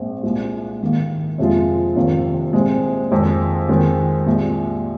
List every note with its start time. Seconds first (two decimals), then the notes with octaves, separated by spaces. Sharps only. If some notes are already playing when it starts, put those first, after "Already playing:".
Already playing: A#1 G#2 G#3 C4
0.23 C2 A#2 G#3
0.81 G#2 D#3 A#3
1.38 F2 C3 F3 G#3 F4
1.96 F1 F2 D#3 A#3 F4
2.53 C2 A#2 G#3 C4
3.11 F2 D#3 G#3 F4 C5
3.69 F2 D#3 G#3 C4
4.26 C2 A#2 G#3